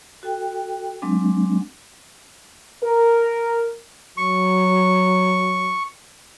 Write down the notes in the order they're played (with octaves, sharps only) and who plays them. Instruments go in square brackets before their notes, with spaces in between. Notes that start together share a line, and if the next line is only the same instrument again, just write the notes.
[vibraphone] F#4 A4 G5
F#3 G#3 C4 D4
[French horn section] A#4
[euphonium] F#3 [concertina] C#6